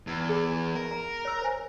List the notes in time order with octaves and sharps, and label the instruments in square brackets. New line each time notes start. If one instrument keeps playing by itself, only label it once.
[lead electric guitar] E2
[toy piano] G#4
[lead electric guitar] A#4
[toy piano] A#5
C#5 E6
C5 G#5